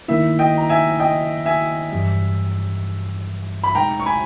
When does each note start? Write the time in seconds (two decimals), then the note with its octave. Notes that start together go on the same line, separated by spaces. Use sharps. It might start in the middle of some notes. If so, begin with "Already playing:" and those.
0.08 D#3 A#3 E4 E5
0.39 D#5 G5
0.58 A#5
0.69 E5 G#5
1.00 D#5 G5
1.46 E5 G#5
1.92 G2 E3 G3
3.64 B5
3.75 B2 G#3 D#4 G5 A#5
4.00 C#6
4.06 G#5 B5